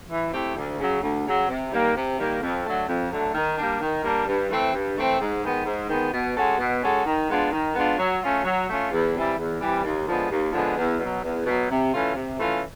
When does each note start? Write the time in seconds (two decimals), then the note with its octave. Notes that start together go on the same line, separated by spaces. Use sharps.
0.09 E3
0.32 A3 C4 E4 G4
0.56 D2
0.79 C#3 F#3
1.02 D2
1.26 C#3 F#3
1.48 C3
1.71 D#3 G3 A#3
1.95 C3
2.19 D#3 G3 A#3
2.41 F2
2.65 D3 F#3 A3
2.87 F2
3.11 D3 F#3 A3
3.34 D#3
3.57 G3 A#3 D4
3.81 D#3
4.03 G3 A#3 D4
4.27 G2
4.49 E3 A3 C4
4.74 G2
4.97 E3 A3 C4
5.19 G#2
5.43 D#3 G#3 B3
5.65 G#2
5.89 D#3 G#3 B3
6.13 B2
6.35 G#3 C#4 F#4 A4
6.58 B2
6.82 G#3 C#4 F#4 A4
7.06 D#3
7.28 G#3 B3 D4 F4
7.52 D#3
7.75 G#3 B3 D4 F4
7.98 F#3
8.21 A3 C#4 F4
8.44 F#3
8.67 A3 C#4 F4
8.91 E2
9.14 C3 E3 G3
9.37 E2
9.60 C3 E3 G3
9.84 D#2
10.07 D3 F3 G#3 B3
10.30 D#2
10.53 D3 F3 G#3 B3
10.77 E2
10.99 B2 F#3
11.22 E2
11.45 B2 F#3
11.69 C3
11.92 E3 A3 C#4 F4
12.15 C3
12.39 E3 A3 C#4 F4